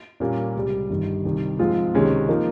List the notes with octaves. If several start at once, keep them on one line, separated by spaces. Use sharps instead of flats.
A#2 G3 A#3 C#4 F4
C#2 C3 G3
G1 G2 D#3
C2 C3 D#3 G3
G#2 F3 G#3 C4 F4
C#2 C3 D#3 G#3 C#4
F3 A#3 D#4 A#4